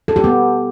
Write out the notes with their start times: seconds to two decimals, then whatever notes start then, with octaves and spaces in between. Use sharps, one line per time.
0.08 A4
0.16 G4
0.24 B3